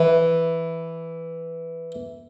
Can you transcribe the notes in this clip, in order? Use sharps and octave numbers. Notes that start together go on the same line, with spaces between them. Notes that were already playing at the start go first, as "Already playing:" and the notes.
Already playing: E3